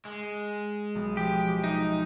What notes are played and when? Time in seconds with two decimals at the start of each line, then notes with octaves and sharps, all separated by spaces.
0.05 G#3
0.95 B1
1.17 F3 G4
1.64 D#4 E5